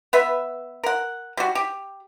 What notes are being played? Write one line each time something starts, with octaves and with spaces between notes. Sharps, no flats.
B3 B4 E5
A#4 F#5
G3 F#4
G4